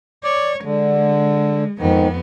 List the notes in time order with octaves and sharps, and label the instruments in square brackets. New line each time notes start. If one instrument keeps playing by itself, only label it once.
[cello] C#5 [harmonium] D5
[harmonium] D3 [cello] G#3
[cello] F2 B3 [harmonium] G#2 D#3